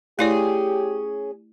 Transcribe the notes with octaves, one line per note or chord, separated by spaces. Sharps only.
A3 C#4 E4 G4 G#4 D5